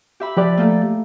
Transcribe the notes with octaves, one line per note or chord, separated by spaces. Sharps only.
G4 E5 B5
F3 G4 B4 D5
A3 A#3 A4